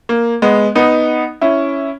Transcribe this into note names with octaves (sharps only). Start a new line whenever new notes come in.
A#3
G#3 B3
B3 D#4
C#4 E4